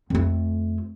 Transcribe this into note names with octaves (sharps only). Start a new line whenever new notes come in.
F2 A3